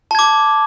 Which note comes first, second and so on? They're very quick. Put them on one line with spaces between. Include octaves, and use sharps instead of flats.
A5 G#6 D6